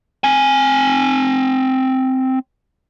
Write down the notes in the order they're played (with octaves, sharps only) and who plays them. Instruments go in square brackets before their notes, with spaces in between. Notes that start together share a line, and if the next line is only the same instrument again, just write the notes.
[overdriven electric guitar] C4 G#5